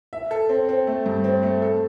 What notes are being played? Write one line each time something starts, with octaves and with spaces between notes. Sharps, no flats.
E5
A4
C4
C4
A3
G2
C4
A3
A4